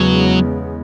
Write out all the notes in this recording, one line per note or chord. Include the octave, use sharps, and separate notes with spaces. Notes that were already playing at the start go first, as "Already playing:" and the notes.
Already playing: E2 C#3 F#3 G#3 B3